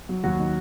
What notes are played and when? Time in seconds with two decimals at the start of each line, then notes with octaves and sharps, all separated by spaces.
0.09 F#3
0.24 D#2 F#3 F#4
0.39 D#3